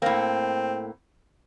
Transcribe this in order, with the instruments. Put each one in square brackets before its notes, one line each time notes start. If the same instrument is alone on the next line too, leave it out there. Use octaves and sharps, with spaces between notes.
[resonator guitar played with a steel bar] A2 A#3 [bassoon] C4